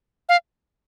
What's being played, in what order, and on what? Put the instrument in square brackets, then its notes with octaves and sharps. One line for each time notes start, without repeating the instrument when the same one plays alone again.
[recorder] F5